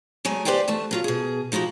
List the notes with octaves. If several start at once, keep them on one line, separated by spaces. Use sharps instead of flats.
F#3 G#3 A3 G#5
G4 A4 B4 C5 D5 G5
D2 E3 A3 A5
F#3 F4 C#5
B2 G#4
F3 D#4 E4 F#4 G4